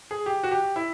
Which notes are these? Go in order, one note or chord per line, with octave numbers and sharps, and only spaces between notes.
G#4
G4
F#4
G4
E4